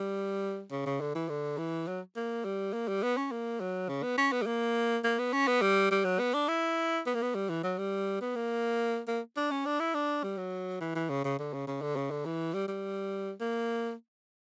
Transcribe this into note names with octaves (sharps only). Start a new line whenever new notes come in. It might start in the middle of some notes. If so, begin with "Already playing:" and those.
Already playing: G3
C#3
C#3
D3
E3
D3
E3
F#3
A#3
G3
A#3
G3
B3
C#4
A#3
F#3
C#3
B3
C#4
B3
G3
A#3
A#3
B3
C#4
B3
G3
G3
F#3
B3
D4
E4
B3
A#3
B3
G3
E3
F#3
G3
B3
A#3
A#3
D4
C#4
D4
E4
D4
G3
F#3
E3
E3
C#3
C#3
D3
C#3
C#3
D3
C#3
D3
E3
G3
G3
A#3